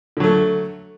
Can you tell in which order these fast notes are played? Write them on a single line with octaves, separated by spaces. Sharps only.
D3 F#3 A3